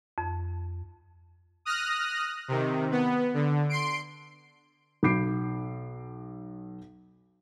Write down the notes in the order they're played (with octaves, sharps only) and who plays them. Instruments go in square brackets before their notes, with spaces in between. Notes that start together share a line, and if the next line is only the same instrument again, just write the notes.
[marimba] F2
[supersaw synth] D#6 F6 F#6 A#6
C3 D#3
B3
D3
C6 C7 D7
[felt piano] B1 B5 D6 G6 C7 D7